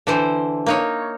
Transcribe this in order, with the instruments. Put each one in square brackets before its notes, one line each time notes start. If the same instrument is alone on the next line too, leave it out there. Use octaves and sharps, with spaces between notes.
[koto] D3 E3 C5
A#3 D#4 C#5